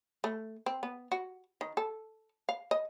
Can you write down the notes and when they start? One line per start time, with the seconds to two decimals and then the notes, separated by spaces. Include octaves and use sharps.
0.24 A3
0.66 C4
0.83 B3
1.12 F#4
1.61 D#3
1.77 A4
2.49 F5
2.71 D#5